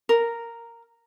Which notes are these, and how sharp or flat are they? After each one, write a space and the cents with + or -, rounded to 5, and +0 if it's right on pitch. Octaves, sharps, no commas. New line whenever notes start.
A#4 -5